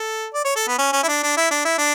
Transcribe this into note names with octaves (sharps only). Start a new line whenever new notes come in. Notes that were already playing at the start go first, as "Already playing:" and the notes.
Already playing: A4
D5
C#5
A4
B3
C#4
C#4
E4
D4
D4
E4
D4
E4
D4